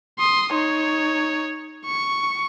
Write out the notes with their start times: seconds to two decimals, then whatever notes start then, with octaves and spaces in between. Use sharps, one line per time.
0.19 C6 D#6
0.53 D#4 C#5
1.86 C#6